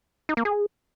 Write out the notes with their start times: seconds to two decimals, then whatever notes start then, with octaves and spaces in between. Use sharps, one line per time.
0.29 D#4
0.37 A#3
0.45 G#4